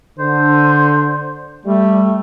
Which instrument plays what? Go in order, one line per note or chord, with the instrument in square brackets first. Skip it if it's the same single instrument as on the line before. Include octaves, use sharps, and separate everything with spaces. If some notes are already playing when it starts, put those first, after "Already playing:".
[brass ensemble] D3 [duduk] C5
[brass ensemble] G3 [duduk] A3